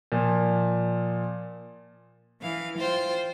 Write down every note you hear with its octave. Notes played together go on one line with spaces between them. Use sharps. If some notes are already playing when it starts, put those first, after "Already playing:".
A#2 F3
E3 F5
F4 C5 G5